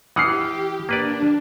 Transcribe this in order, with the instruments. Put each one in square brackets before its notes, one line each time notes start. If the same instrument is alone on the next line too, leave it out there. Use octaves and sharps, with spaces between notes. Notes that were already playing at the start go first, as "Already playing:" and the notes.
[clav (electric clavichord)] E3 F#5 [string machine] G4 [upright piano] D#6 F6 C7
[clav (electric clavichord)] A#3 B4 D5 [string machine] D4